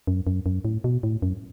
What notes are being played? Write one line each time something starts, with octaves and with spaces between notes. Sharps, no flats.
F#2
F#2
F#2
A2
B2
A2
F#2